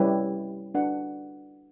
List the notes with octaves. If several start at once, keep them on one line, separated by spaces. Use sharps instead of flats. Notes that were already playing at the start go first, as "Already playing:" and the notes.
Already playing: G3 C#4 E4 G4 B4
D4 F#4 B4 F#5